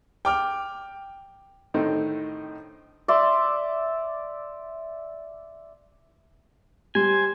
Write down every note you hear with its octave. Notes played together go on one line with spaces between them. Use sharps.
G5 D6 F6
A2 D3 D#3 C4 D#4
D5 E5 C6
G3 C5 G#5